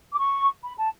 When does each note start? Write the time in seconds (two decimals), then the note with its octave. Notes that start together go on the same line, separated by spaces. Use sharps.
0.13 D6
0.18 C#6
0.63 B5
0.78 A5